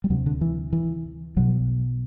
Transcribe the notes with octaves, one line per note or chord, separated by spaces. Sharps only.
G3
D2 C3 F#3
D3
E3
E3
B1 B2 F#3